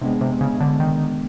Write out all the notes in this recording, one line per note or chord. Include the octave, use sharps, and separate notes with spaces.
C3 G#3 B3 D4
C3
C#3
D3
D#3